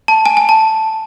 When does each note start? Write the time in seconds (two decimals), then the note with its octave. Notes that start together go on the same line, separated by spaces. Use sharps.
0.08 A5
0.26 G#5
0.37 G#5
0.49 A5